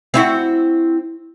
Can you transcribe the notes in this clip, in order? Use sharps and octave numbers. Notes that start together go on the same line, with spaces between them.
C4 E4 F#4